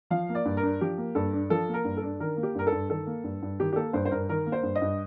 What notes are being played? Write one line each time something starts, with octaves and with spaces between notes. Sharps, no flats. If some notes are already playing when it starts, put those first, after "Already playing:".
F3 F5
A#3
D5
G2
A#4
D4
F3 G4
A#3
G2 A4
D4
F3 A4
A#3
A#4
G2
A4
D4
D#3 A#4
A#3
G4
G2 A#4
A4
G2
D#3 A4
A#3
G2
G2
D#3 G4
G4
A#3 A4
G2 C5
C5
G2 A#4
D#3 A#4
A#3
C5
G2
D#5
G2